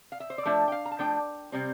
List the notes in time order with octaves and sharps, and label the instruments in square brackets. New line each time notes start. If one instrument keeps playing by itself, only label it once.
[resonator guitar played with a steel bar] F5
E5
C5
D5
F3 A3 D4 E5
G5
F5
A#5
A5
F3 A3 D4 G5
C3 G3 C4